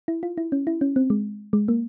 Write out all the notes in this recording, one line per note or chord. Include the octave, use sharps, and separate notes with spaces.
E4
F4
E4
C#4
E4
C#4
C4
G#3
G#3
A#3